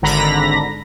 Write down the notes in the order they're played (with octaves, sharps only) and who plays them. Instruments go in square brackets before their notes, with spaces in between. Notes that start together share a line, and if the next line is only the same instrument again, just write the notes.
[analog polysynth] G#1 D3 A#5 B5 A#6